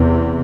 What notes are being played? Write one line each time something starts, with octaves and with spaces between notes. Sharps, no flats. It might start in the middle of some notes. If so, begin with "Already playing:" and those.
Already playing: E2 C3